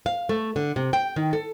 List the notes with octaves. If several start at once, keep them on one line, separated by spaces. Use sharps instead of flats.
F5
A3
D3
C3
G5
D#3
A4